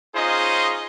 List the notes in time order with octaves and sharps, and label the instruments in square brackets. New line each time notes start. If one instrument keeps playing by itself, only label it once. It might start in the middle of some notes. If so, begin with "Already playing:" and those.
[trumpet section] C#4 D#4 F4 G#4 C5 D#5